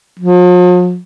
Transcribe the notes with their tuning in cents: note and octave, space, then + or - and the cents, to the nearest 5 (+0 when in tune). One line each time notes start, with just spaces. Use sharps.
F3 +45